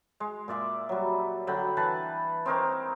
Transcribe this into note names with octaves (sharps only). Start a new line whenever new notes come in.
G#3
A#2 D5 E5 D6
F#3 G3
D3 F#3 G5 B5
E3 B4 A5 B5
C4 D#4 A#4 C#5